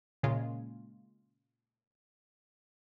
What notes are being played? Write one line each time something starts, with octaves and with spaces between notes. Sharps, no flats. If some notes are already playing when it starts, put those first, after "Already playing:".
A#2 C#3 G#3 F4